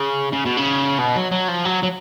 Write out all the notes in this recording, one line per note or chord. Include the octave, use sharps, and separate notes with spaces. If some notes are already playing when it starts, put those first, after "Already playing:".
Already playing: C#3
C#3
B2
C#3
B2
F#3
F#3
F3
F#3
F#3